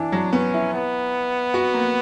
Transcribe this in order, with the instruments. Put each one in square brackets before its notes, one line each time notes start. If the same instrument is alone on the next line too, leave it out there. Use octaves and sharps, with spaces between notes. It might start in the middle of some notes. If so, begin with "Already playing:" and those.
Already playing: [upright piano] E3 [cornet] D4
[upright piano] F#3
[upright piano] B3 [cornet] C#4
[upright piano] E4
[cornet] B3
[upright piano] F#4
A#3